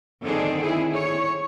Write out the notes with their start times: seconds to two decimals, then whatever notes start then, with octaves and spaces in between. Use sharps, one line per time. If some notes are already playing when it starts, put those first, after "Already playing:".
0.23 D3 D#3 C4 D4 G#4 A4
0.61 E4 G#4
0.91 C#5